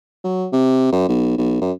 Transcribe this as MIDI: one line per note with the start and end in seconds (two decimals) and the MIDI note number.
0.24 0.46 54
0.52 0.88 48
0.92 1.07 42
1.08 1.36 35
1.37 1.60 35
1.61 1.72 42